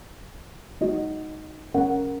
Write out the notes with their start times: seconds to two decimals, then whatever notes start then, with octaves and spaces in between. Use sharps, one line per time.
0.81 D#4 F#4 D#5
1.74 C#4 A#4 F#5